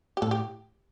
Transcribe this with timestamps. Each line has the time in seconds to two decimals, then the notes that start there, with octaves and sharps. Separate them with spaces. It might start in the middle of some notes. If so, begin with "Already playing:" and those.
0.17 G4
0.22 A2 A4
0.31 G4